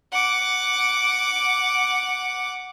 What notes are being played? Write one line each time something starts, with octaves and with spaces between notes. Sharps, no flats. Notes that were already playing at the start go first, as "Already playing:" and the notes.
F#5 D6